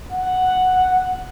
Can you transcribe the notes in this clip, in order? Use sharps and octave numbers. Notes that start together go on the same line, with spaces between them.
F#5